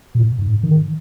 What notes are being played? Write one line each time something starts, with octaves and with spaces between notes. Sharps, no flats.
A#2
G#2
D#3